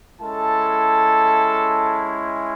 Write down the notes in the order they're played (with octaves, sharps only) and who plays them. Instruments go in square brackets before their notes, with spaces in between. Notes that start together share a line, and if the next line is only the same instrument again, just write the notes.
[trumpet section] G#3 C#4 E4 A4 A5